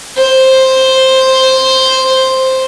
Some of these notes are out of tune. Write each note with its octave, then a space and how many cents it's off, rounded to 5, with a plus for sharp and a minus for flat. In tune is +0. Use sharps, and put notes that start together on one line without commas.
C5 +5